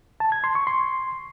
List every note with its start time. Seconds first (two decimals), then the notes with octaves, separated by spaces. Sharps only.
0.20 A5
0.32 G#6
0.44 C6
0.55 C#6
0.67 C6